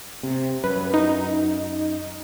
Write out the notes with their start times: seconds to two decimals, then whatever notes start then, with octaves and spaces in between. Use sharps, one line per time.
0.23 C3
0.64 F#2 B4
0.94 D#4